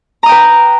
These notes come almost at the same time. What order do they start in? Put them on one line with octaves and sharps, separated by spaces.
A#5 D#6 G5 B4